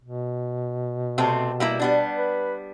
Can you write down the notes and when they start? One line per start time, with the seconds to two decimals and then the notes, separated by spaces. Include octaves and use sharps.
0.03 B2
1.18 C3 A3 C4
1.60 G3 A#3 E4
1.79 G3 B3 D4
2.17 B4